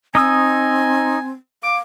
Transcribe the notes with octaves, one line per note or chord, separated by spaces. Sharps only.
C4 D#4 G#5 D#6 E6
F5 D6